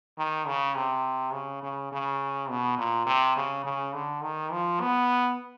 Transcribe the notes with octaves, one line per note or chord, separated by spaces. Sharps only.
D#3
C#3
C3
C#3
C#3
C#3
B2
A#2
C3
C#3
C#3
D3
D#3
F3
B3